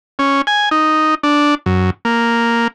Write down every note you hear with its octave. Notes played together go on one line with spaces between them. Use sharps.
C#4
G#5
D#4
D4
F#2
A#3